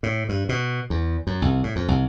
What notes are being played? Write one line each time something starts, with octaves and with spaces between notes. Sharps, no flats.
A2
G2
B2
E2
F#2
C2
A2
F2
C2